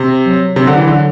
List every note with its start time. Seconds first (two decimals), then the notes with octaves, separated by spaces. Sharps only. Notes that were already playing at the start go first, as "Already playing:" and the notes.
Already playing: C3
0.25 F#3
0.56 C3
0.67 D3
0.78 E3
0.88 D3